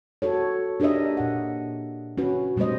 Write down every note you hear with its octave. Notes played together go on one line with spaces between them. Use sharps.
F#4 A4 C#5
D4 G4 A#4 C#5 D#5 E5
A#2 F#5
C#4 F#4 B4
A#2 G3 A3 B3 C5 D#5